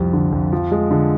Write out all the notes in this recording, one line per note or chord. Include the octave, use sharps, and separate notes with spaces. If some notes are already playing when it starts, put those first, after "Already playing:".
Already playing: C2 F2 G3
D3
F2
F3
G#3
D3